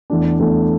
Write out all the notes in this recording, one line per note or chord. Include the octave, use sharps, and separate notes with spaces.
E2 E3 A3 D4
E2 E3 A3 D4